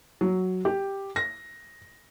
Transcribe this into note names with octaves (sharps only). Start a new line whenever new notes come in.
F#3
G4
A#6